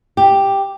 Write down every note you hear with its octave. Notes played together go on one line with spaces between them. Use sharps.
G4